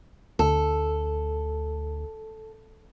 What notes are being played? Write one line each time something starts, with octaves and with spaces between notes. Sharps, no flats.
D2 A4